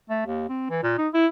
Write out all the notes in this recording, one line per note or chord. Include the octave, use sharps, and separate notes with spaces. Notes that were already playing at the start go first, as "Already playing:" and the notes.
A3
D#2
C4
E3
A#2
D#4
E4